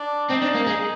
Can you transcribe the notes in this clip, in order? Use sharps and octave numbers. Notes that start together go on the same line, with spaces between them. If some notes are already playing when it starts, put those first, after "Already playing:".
Already playing: D4
C4 D#4
D4
A#3
G#3